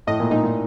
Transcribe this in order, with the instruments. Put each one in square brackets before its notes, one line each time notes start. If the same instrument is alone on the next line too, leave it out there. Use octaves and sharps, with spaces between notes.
[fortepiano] A2 [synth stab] D#5
[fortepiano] A#2
[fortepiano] A#2 [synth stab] D#4
[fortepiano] A#2